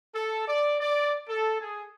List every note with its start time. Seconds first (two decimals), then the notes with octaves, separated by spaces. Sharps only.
0.15 A4
0.48 D5
0.81 D5
1.29 A4
1.61 G#4